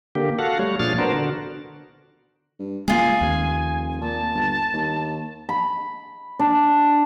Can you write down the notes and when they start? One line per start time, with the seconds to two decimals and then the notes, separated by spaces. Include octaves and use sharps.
0.15 D3 A#3 G4
0.39 F#4 A4 F5 F#5
0.59 G3 A3 C#5
0.80 A#2 F3 D4 G#4 F6 A6
0.98 B3 D4 F#4 A#4 C5
1.13 D3 F#4
2.59 G2
2.88 C#2 G#3 A#3 F4 G#4 G#5
3.21 F1 D#2
4.01 A#2 A5
4.34 G1
4.73 D#2
5.49 B5
6.39 D4